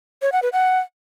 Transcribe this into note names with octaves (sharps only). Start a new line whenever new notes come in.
C#5
F#5
B4
F#5